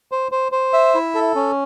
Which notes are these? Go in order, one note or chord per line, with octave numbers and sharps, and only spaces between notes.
C5
C5
C5
E5
E4
A4
C#4